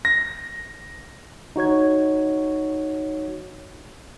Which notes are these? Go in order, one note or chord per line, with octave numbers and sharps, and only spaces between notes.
A#6
D#4 F#4 C#5 G#6